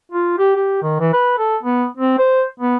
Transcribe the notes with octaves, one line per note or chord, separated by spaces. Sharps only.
F4
G4
G4
D#3
E3
B4
A4
B3
C4
C5
B3